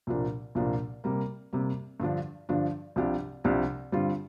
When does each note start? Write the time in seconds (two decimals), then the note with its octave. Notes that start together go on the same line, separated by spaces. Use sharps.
0.07 C2 A#2 F3 A#3 D4
0.55 C2 A#2 F3 A#3 D4
1.04 C3 G3 A#3
1.53 C3 G3 A#3
2.00 G2 D3 F3 D4
2.49 G2 D3 F3 D4
2.96 C2 C3 F3 D4 G4
3.44 C2 C3 F3 D4 G4
3.92 G2 D3 G3 C4 F4